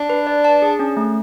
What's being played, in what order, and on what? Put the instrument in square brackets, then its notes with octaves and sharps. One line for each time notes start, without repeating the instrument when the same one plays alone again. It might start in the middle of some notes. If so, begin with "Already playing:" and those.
Already playing: [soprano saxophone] D4
[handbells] B4
D5
A5
G#4
C#4
A3